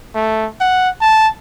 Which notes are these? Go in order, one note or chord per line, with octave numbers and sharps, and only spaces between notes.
A3
F#5
A5